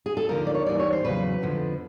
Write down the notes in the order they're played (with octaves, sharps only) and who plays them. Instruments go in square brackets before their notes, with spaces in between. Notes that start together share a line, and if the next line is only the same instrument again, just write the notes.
[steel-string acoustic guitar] G#4
A4
D#2 D3 F3 A#4
D5
C#5
D#2 C#3 E3 G3 D5
C#5
C5
E2 C#3 F#3 B4
F2 D3 F3